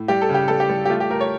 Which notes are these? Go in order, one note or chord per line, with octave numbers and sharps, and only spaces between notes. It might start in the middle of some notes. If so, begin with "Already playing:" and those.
Already playing: A2
G3 G4
A4
C#3
G4
G3 A4
G4
G3
G4
A3 F4
G4
A3 A#4
C#5